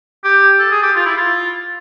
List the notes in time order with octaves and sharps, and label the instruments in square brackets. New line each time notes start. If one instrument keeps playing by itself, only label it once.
[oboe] G4
A4
G#4
G4
F4
E4
F4